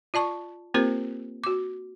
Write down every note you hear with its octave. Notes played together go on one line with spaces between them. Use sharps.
F4 D5 A5 C#6
A#3 C4 F4 G4 A#4 C5
F#4 D6